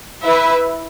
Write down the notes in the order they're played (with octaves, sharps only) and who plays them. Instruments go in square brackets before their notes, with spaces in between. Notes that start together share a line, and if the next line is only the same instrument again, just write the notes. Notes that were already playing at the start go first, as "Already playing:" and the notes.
[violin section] E4 B4 E5